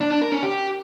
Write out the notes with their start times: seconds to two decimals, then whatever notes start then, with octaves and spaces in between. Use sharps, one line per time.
0.01 D4
0.11 D4
0.22 A#4
0.32 C#4
0.42 G4